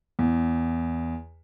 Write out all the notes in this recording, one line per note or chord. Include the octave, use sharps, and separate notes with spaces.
E2